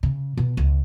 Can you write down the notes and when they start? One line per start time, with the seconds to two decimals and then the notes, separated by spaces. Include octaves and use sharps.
0.03 C#3
0.37 B2
0.57 C#2